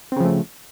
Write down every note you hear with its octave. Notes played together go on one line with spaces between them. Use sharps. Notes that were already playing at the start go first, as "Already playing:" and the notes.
C#3 F3 A3 C4